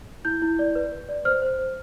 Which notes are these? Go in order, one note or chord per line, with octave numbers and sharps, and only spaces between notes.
E4 G6
E4
D5
B4
B4
D5
C5 F6
C5
C5